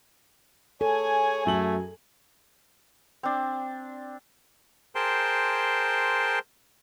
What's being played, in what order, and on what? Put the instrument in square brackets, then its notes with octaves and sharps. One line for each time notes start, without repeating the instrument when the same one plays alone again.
[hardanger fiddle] G#4 G#5 [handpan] A4 [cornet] C#5
[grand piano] F#2 F#3 F#7 [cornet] A3
[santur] C4 D4
[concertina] G#4 A#4 C5 G5 A5 C6